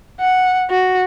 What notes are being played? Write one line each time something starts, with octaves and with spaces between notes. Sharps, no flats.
F#5
F#4